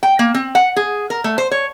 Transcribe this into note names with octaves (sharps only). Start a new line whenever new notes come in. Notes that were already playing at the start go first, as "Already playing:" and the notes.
G5
A#3
C4
F#5
G#4
A#4
A3
C5
C#5